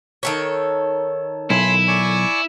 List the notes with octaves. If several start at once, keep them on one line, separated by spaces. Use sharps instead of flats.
D#3 A4 C#5
B1 E4 G#5 B5 C6
D5 G#5 C#6